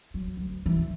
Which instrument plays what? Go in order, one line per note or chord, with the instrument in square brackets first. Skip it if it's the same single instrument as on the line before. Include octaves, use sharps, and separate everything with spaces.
[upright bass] F#3
D2
E3